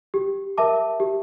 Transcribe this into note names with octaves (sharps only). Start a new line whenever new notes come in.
G4
A#4 E5 A5 D6
G4